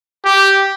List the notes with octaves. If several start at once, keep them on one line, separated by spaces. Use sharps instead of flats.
G4